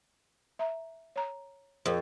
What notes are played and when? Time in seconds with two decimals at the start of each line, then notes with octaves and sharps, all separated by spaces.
0.59 E5 A#5
1.16 C#5 A#5
1.86 F2 G#4 A#4 C5